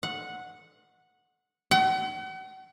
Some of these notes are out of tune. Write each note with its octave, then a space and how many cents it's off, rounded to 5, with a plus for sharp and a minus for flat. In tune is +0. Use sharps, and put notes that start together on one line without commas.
F#5 -10
F#5 +40